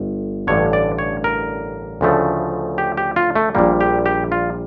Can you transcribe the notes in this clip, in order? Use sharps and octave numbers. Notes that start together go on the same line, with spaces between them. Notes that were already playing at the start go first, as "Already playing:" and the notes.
Already playing: G1
A1 G2 D3 C#5
D5
C#5
A#4
D2 C#3 F3 A3
G4
G4
F4
A3
A#1 A#2 G3 A#3
G4
G4
F4